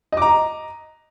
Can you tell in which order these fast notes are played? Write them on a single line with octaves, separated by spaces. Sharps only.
D#5 D6 A#5